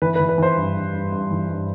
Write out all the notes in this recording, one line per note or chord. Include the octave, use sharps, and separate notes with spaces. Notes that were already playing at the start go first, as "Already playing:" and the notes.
E3 B4
B4
E3
B4
E3 C5
G2
G2
G2
G2
E3
G2